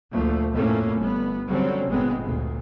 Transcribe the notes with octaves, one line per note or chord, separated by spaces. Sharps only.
D2 A#2 F3 A3
F2 A2 A3 A#3 C#4
G1 B3
D3 F#3 G3 C4 C#4
G1 A#2 G#3 B3 C4
D2 A#2